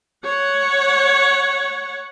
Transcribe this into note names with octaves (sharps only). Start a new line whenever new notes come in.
C#5 F#5